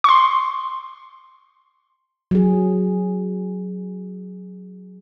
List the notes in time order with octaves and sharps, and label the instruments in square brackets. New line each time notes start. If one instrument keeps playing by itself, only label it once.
[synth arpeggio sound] C6 C#6
[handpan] F#3 G#4